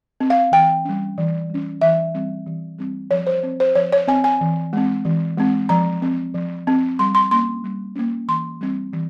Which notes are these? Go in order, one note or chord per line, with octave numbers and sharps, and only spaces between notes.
C4
F5
E3 G5
G3 C#4
E3
G3 C#4
E3 E5
G3 C4
E3
G3 C4
F3 C#5
C5
C4
C5
F3 C#5
C#5
C4 G#5
G#5
E3
G#3 C4
E3
G#3 C4
F3 A#5
C4
F3
C4
G3 C6
C6
A#3 C#4 C6
G3
A#3 C#4
E3 C6
G3 C4
E3